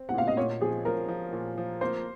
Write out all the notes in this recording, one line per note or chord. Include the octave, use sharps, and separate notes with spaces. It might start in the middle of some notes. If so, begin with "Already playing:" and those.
Already playing: C4
F#5
A#2 F5
D#5
A#2 C#5
F3 G#4
F3 A#4
F3
A#2
F3
A#3 C5